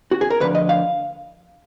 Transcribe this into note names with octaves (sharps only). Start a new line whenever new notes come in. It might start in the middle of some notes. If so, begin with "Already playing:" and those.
F#4
G#4
A#4
D2 D3 F3 B4
D#5
F5